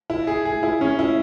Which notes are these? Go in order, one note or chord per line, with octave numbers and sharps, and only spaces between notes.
E4
G#4
G#4
E4
C#4
E4